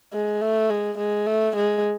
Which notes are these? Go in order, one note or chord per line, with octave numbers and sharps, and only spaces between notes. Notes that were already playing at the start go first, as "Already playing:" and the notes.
G#3
A3
G#3
G#3
A3
G#3